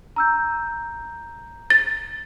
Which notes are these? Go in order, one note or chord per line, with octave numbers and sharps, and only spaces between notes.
A#5 E6 G6
A6